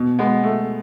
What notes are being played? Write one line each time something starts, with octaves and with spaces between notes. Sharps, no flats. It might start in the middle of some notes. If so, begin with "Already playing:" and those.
Already playing: B2
G#3 B3
A3